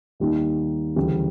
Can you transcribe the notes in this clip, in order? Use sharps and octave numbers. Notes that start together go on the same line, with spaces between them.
D#2 D#3 G3 A#3 D#4
D2 C#3 E3 G3